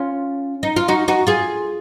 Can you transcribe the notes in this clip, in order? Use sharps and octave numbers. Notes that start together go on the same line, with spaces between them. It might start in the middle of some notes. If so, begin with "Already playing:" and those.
Already playing: C#4 F4
D#4
F4
D#4 F#4
D#4 F#4
F4 G#4